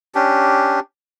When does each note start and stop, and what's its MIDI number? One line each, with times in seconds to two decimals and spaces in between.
0.15 0.80 61
0.15 0.80 62
0.15 0.80 67